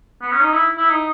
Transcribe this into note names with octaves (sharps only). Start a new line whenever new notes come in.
B3
C#4
D#4
E4
E4
D#4